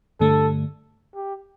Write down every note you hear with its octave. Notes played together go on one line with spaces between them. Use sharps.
G2 D3 A3 A4
G4